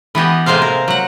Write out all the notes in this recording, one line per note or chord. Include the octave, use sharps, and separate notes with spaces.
E3 B3 G4 D#5
A2 C3 G#3 A#3 C5 F5
A#4
F#3 F#5